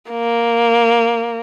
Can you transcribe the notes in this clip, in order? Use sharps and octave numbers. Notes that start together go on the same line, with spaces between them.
A#3